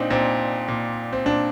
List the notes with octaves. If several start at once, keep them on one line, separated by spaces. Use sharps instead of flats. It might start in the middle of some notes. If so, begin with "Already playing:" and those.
Already playing: A#2 C4 D4 D#4
A#2 C4
A#2
C4
A#2 D4